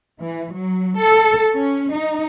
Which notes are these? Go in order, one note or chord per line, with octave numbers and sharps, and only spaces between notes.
E3
F#3
A4
C#4
D#4